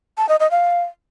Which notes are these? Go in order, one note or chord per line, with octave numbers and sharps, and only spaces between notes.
A5
D#5
D#5
F5